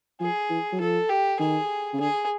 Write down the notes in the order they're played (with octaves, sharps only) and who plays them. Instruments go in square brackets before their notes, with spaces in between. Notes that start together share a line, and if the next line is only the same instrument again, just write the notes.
[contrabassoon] F3 [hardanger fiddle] G#4
[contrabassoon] E3
F#3
[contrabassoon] F3 [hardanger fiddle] A4
[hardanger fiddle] G4
[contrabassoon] D#3 [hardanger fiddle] G#4
[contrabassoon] C#3
[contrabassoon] D3 [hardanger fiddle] G#4